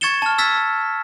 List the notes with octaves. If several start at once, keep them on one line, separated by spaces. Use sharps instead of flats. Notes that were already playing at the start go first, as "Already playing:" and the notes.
C#6 G#6 A6 C#7 E7 G7
A5 F6
E6 F6 G#6 A6 B6